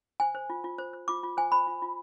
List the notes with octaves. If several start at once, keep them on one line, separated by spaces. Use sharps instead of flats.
C5 G#5
C5
F4
F4
C5
C5
F4 D6
F4
C5 G#5
C5 B5
F4
F4